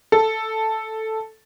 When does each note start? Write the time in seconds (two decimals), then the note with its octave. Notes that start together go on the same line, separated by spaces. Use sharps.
0.12 A4